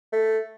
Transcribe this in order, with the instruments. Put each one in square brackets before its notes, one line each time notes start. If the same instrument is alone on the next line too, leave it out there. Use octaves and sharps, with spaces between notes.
[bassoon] A3